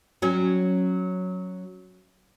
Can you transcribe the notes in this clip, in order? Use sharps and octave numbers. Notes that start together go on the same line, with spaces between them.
F#3 C#4